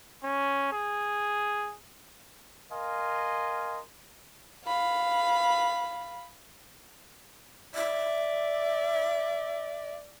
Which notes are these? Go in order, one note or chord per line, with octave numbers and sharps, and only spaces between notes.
C#4
G#4
A#4 D#5 F5 G#5 C6
F5 B5
D5 E5